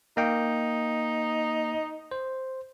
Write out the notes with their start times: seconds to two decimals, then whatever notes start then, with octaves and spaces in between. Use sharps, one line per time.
0.17 A#3 D#4 G5
2.11 C5